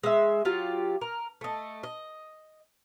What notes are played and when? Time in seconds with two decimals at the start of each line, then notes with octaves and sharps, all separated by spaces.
0.03 G#3 E5
0.45 F#3 F4 G4
1.01 A#4
1.41 A3 D#5
1.83 D#5